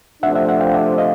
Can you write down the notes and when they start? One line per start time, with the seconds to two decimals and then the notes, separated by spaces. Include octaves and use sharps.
0.23 C3 F3 A3 D4 E5 F#5
0.35 E5 F#5
0.48 E5 F#5
0.60 F5 G5
0.74 E5 F#5
0.98 D#5 F5